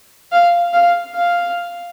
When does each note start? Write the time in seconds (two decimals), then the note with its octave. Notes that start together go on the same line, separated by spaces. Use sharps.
0.32 F5
0.73 F5
1.15 F5